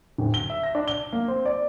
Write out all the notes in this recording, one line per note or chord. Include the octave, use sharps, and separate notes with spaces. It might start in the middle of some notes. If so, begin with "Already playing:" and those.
D1
G7
E5
A#6
D4
G7
A#3
C4
D5